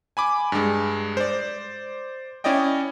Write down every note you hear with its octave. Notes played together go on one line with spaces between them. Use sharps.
G#5 B5 D6
G2 G#3
C5 D5
C#4 E4 D5 D#5 G5